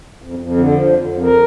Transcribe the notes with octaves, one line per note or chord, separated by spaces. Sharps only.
F2
F2
D3
F3
F2
F2
A#4